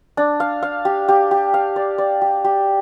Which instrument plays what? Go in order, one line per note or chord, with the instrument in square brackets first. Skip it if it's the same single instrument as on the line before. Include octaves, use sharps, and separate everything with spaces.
[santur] D4
F5
F5
G4
G4
G4
F5
D5
D5
G4
G4